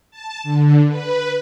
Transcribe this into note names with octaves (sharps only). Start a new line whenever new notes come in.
A5
D3
B4